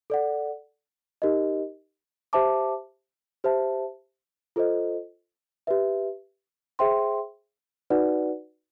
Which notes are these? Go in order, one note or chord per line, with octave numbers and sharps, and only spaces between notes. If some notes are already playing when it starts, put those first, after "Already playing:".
A4 D5 F#5
D#4 G4 A#4 D#5
G4 C5 E5 A5 D6
G4 C5 E5 A5
F4 A4 C5 D#5
G4 B4 E5
G#4 C5 E5 G5 C6
D#4 F#4 B4 D5 F#5